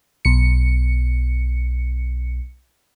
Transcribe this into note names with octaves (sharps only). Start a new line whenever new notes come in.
B1 C#7